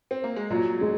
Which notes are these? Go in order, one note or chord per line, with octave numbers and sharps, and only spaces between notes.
C4
A#3
G#3
A#2 F#3
G#3